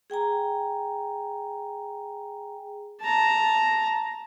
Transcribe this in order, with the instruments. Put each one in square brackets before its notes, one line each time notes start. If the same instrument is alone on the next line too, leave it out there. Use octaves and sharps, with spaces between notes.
[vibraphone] G#4 G5 G#5 A#5
[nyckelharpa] A5 A#5